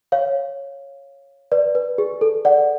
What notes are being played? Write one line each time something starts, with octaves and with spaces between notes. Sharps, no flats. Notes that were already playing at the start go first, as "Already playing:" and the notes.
C#5 F5
B4 D5
B4
G#4
A4
D5 F#5